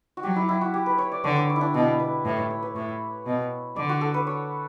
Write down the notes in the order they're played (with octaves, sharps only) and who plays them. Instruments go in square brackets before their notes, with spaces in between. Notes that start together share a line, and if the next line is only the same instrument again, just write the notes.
[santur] F#4
[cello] F#3 [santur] G4
[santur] E4
E4
F#4
G4
B4
C#5
D5
[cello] D3 [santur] C#5
[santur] D5
C#5
E4
D4
[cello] B2 [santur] E4
[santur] B4
[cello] A2 [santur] B4
[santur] C#5
C#5
B4
[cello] A2 [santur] C#5
[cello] B2
[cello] D3 [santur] D5
[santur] F#4
A4
B4
C#5